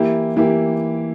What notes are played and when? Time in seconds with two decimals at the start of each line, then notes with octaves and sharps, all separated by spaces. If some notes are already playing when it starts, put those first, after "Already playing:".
Already playing: E3 A#3 E4 G4
0.36 E3 A#3 E4 G4